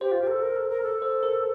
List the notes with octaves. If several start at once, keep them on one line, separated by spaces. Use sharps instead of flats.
G4 C5
F4
G4
A#4
A4
A#4
A4
A#4
A4
C5
A#4